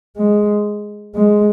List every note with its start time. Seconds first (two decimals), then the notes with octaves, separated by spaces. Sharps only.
0.17 G#3
1.15 G#3